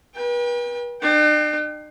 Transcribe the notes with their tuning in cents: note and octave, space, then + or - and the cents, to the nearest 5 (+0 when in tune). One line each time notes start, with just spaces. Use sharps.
B4 -40 G5 +35
D4 +45 G5 +5